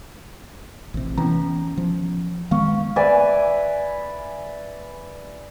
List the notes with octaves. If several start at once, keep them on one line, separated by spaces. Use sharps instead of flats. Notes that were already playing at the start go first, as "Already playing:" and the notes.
A1 C3
E3 B3 C#4 A#5
F3
D#3 G#3 B3 F5 C#6
B4 D5 E5 G#5